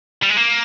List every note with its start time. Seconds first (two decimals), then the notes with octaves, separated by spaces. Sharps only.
0.23 G3
0.30 G#3
0.37 A#3